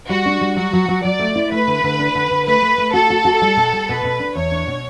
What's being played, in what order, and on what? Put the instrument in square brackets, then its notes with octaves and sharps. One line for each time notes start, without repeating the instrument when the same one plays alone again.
[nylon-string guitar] G3 [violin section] F#4
[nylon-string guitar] D4
G3
[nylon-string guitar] F#3 [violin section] F#4
[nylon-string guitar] F#3
F#3
[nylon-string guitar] F#3 [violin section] D5
[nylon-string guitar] A3
E4
[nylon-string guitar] A3 [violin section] B4
[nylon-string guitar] D3
D3
D4
D3
D3
[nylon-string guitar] A3 [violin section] B4
[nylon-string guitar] A3
A3
[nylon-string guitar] F#4 [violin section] A4
[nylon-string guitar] F#4
F#4
G3
B2
G3
[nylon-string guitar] B2 [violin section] B4
[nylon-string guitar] B2
D4
[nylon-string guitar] E2 [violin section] C#5
[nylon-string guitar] D4
B2